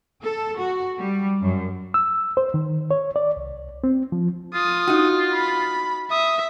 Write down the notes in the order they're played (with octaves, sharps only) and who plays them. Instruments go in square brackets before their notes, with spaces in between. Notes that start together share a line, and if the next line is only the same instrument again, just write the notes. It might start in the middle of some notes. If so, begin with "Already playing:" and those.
[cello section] A4
F#4
G3
F#2
[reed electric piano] E6
C5
D#3
C#5
D5
C2
C4
F3
[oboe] F4 [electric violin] D#6
[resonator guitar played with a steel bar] D#4 F#4
[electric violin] B5
[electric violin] E5 [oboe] D#6